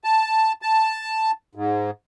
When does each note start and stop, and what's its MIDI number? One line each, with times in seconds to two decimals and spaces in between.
0.04 0.52 81
0.62 1.31 81
1.55 1.91 44